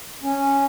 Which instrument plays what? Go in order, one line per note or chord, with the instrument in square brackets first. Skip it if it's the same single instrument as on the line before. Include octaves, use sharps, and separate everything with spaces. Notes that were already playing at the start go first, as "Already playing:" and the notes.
[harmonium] C#4